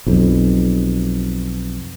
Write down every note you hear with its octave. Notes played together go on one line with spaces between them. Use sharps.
B1 F2